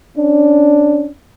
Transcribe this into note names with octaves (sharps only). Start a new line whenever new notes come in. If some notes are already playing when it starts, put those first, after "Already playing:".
C#4 D4